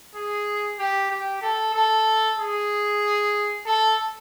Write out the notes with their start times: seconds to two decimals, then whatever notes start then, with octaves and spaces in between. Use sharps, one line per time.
0.15 G#4
0.79 G4
1.10 G4
1.42 A4
1.75 A4
2.39 G#4
3.66 A4